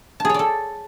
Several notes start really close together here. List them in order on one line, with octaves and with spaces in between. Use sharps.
A5 G#4 C#5 D5 A4